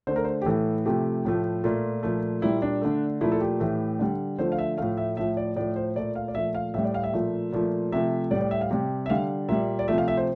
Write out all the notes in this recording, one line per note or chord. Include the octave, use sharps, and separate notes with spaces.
D3 A3 C5
A#4
C5
G4
A2 E3 A3 A4
C3 F3 A3 G4
A2 F3 A3
A#2 A3 F4
A#2 F3 A3
A#2 G3 E4
D4
D3 A3
A#2 F3 A3 E4
A4
G4
A2 E3 A3
D3 G3
D3 F3 A3 C5
F5
E5
A2 F3 A3 F5
E5
A2 F3 A3 E5
D5
A2 F3 A3 D5
C5
A#2 A3 D5
F5
D5
A#2 F3 A3 E5
F5
A2 G3 E5
D5
F5
E5
A#2 F3 A3
A#2 F3 A3
C3 F3 A3 E5
A2 G3 D5
D5
E5
F5
C3 G3
E5
D3 G3 F5
A#2 G3 E5
D5
C3 F3 A3 E5
F5
E5
C5